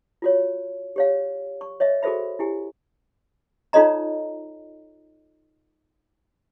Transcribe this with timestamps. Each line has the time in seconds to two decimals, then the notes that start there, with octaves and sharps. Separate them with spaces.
0.22 F4 F#4 C#5
0.96 G4 C#5 F5
1.61 C#6
1.80 C#5 D#5 E5
2.03 F#4 G#4 A4 C5 E5 B5
2.39 E4 G4 G#5
3.73 D#4 F4 A4 C#5 D#5 A#5